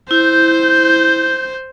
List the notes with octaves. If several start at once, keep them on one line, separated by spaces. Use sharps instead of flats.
E4 C5 G6